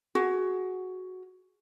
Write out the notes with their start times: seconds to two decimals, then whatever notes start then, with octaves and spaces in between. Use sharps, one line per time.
0.15 F#4 G#4